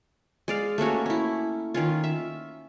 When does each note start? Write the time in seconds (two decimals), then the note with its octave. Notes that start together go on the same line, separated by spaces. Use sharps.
0.48 G#3 D5 F5
0.78 A3 A#3 C#4 F#4
1.06 C#4 E4
1.74 D#3 C#4 F4
2.04 E5